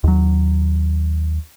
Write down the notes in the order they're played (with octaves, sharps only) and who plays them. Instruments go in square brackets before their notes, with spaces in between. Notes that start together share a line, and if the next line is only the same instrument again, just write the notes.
[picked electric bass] D#2 F#3